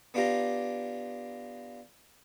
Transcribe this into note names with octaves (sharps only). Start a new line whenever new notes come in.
B3 D4 F4 G4 F5 A#5